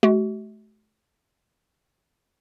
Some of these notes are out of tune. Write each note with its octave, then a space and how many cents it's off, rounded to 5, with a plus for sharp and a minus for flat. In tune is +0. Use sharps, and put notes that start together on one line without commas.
A3 -40 F#4 +40